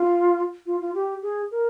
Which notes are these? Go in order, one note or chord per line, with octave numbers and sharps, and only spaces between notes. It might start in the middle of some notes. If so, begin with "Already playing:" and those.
Already playing: F4
F4
F4
G4
G#4
A#4